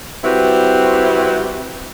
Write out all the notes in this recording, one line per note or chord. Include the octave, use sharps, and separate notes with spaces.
G3 C4 E4 F#4 G4 B4